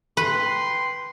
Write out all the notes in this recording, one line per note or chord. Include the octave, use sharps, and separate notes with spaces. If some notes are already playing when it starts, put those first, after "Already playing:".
B4 G5 C6